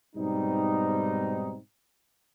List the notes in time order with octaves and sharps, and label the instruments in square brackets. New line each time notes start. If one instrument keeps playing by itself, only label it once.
[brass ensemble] G#2 B2 G3 C4 D#4